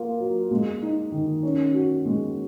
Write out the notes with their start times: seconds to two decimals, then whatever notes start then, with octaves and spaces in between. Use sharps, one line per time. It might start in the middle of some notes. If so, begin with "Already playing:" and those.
Already playing: A#3 F4
0.20 F#3
0.51 G#3
0.82 D#4
1.12 D#3
1.43 C#4
1.74 F#4
2.05 G#3